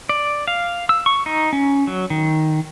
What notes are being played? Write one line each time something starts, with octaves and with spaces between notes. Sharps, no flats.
D5
F5
E6
C#6
D#4
C#4
F#3
D#3